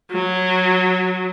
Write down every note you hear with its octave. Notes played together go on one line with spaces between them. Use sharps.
F#3